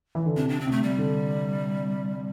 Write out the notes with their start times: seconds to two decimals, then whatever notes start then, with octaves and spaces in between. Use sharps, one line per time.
0.15 E3
0.26 D3
0.36 C3 D4
0.49 D4
0.60 C4
0.67 C3 A3
0.83 G3
0.98 D3